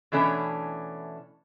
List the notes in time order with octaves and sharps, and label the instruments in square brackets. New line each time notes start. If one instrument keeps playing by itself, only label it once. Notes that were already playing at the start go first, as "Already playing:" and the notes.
[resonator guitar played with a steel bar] B2 E3 A3 C#4 D4